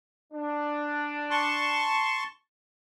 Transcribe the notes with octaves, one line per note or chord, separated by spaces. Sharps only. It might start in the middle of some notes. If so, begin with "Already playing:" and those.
D4
A5 C6 C#6